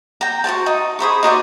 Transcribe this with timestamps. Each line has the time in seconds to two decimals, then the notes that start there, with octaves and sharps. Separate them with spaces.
0.21 G5 A#5
0.44 F#4 A#4 C5 A5
0.66 D#4
0.99 G#4 C5 B5 C#6
1.23 D#4 F#4 C5 D5